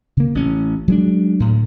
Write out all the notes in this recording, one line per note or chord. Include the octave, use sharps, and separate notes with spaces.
C#3 A#3
A1 C#4
F#3 G#3 D4
D2 A2